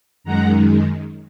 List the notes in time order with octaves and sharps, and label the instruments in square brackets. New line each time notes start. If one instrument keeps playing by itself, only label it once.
[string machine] F#2 D#3 G#3 F#5 A#5